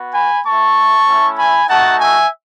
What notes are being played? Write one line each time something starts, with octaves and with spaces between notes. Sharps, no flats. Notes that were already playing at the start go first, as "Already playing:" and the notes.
Already playing: B3 F#4
G#5 B5
A3 E4 A5 C#6
A3 C#4 E4
G#5 B5
A3 D#4 F#4 F#5 A5
E5 G#5